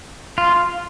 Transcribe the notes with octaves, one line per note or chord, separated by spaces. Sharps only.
F4